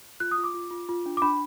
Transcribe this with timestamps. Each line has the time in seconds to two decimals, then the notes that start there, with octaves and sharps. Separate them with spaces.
0.20 F4 F#6
0.31 D#6
0.38 F4
0.44 D6
0.54 F4
0.71 F4
0.89 F4
1.06 D4
1.17 D6
1.22 D4 B5